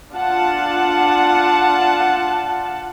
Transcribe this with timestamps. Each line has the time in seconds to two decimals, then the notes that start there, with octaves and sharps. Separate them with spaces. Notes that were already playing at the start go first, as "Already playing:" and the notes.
0.13 D4 F4 F#5 A5